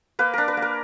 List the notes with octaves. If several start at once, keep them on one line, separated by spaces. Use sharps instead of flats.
A#3 B4
D4 A#4
B4
A#3
A#4